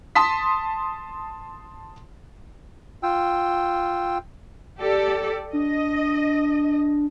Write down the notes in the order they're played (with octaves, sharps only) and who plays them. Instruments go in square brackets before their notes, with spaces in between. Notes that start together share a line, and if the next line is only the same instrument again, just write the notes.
[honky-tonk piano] A5 C6 D#6 B6
[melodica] F4 G5 E6
[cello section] G4 A4 D5
[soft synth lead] D4 [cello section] D#5